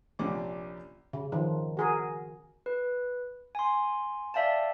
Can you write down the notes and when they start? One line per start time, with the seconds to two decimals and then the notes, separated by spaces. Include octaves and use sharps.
0.19 A#1 C3 A#3 C#4 D4 D6
1.13 C#3
1.32 D#3 F3
1.77 F#4 G#4 A#4
2.66 B4
3.55 G#5 C6
4.34 D5 E5 F5 G5 A5